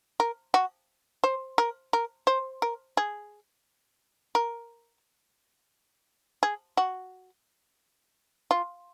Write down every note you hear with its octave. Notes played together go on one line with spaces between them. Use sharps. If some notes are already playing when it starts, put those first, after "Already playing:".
A#4
F#4
C5
A#4
A#4
C5
A#4
G#4
A#4
G#4
F#4
F4